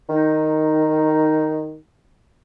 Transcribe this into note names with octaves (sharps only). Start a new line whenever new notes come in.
D#3 D#4